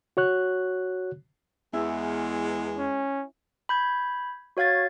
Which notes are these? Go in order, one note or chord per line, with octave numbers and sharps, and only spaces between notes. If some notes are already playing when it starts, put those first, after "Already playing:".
F#4 C#5 F#6
E2 G#3 E4
C#4
B5 G6 G#6
F#4 C#5 F5 G#6 A6